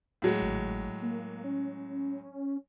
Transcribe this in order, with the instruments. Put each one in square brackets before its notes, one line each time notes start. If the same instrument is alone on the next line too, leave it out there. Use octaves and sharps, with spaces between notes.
[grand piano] A2 F#3 G#3
[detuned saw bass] G#1
A#3
C#4